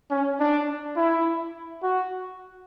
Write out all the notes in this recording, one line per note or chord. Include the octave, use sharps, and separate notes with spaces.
C#4
D4
E4
F#4